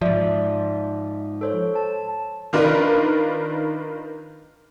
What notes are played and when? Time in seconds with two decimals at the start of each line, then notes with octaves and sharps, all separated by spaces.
0.01 G#2 F3 D5 E5
1.41 A4 C5 C#5
1.75 A5
2.53 D#3 D4 F4 A#4 B4